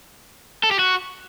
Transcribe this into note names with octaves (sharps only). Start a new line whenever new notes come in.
A4
G4
F#4